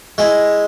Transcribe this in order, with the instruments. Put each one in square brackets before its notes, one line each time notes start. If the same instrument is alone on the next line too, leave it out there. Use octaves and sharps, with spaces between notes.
[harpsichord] G#3 E4